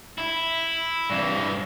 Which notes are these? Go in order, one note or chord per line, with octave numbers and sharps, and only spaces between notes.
E4
G2 E3